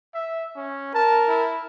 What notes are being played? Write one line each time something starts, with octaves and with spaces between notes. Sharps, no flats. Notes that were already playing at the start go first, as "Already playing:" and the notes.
E5
C#4
A#4 A5
E4